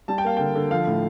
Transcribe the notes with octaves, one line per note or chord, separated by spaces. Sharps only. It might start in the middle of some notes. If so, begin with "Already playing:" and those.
G3 A5
G5
A#3 F5
D3 G5
D3
F3 F5
A2